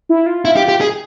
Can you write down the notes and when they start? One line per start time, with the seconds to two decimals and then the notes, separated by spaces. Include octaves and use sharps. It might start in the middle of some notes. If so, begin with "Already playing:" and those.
0.09 E4
0.26 F4
0.45 E4
0.57 G4
0.68 G4
0.81 G#4